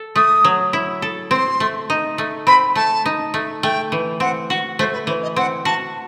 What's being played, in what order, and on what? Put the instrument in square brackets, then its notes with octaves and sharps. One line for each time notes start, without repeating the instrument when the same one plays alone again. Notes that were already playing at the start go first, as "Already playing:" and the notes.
Already playing: [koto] A4
[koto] A3 [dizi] D#6
[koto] F#3
E4
A4
[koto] C4 [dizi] C6
[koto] A3
D#4
A3
[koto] C4 [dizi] B5
[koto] A3 [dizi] A5
[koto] D#4
A3
[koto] A3 [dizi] G5
[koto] E3
[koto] C4 [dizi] F#5
[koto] F#4 [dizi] F#5
[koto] A3 [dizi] C5
[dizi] B4
[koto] E3 [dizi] C5
[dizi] D#5
[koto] C4 [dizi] F#5
[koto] F#4 [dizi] A5